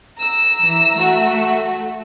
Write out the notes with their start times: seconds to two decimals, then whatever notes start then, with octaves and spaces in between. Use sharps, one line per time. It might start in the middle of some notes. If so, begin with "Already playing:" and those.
0.18 A#5 E6
0.62 E3
0.95 A3 F#4